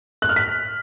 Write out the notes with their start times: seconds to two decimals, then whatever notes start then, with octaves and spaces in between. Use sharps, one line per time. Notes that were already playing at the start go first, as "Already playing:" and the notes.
0.22 F#6
0.29 F6
0.36 B6